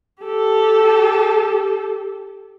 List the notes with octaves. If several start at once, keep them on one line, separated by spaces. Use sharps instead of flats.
G4 A4